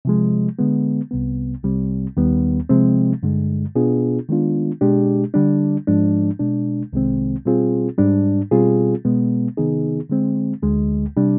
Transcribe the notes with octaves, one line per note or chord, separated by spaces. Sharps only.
C3 F3 G#3
D3 G#3 B3
C2 C3 G3 B3
C2 C3 G3 C4
D#2 D#3 G3 B3
C3 F3 G#3 C4
G2 D3 G#3
B2 B3 D4 F4 G#4
D#3 G#3 B3 D4 F4
B2 G#3 D4 G4
D3 G3 D4
G#2 F3 G#3 D4
B2 G#3 D4
C2 C3 D#3 G#3 C4
B2 G3 C4 F4 G#4
G#2 G3 D4
B2 G3 C4 F4 G#4
B2 G#3 B3
C3 D#3 B3 D#4 G#4
D3 G#3 C4
D2 D3 G#3
C3 G3 D4